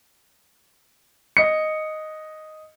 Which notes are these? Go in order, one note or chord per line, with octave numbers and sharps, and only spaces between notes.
D#5 C#7